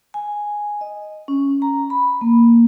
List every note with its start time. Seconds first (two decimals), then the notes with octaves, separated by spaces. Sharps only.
0.14 G#5
0.81 D#5
1.28 C#4
1.62 A#5
1.90 B5
2.21 A#3